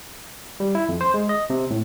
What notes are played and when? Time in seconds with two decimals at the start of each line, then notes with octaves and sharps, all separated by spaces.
0.60 G3
0.75 E4
0.89 F2
1.01 C5
1.14 G#3
1.29 D#5
1.50 C3
1.70 A2